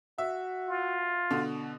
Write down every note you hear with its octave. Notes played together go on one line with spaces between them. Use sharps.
F#4 E5
F4
B2 D3